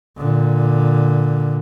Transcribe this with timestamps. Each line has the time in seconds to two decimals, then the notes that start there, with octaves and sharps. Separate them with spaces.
0.17 A#2 D3